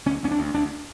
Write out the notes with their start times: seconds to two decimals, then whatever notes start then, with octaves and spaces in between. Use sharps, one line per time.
0.06 D2 C#4
0.23 D2 C#4
0.31 D4
0.39 D2
0.54 D2 D4